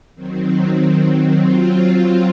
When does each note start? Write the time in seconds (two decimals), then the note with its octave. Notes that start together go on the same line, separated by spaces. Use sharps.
0.15 D#3 F#3 C4
1.37 F#3 C4 F4